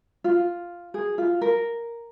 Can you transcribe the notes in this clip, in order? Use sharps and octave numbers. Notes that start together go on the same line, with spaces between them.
F4
G#4
F4
A#4